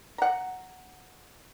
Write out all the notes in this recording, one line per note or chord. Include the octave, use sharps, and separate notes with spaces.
F#5 A#5